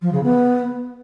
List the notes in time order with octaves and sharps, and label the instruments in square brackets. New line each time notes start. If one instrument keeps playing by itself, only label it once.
[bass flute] F3
C#3
B3